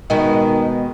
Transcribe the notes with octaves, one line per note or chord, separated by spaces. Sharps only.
B2 D#3 G#3 B3